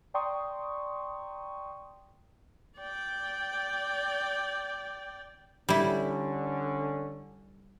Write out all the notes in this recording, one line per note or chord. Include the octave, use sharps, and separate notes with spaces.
D5 G5 A#5 C6 C#6 D#6
D5 G5
D3 G3 C#4 E4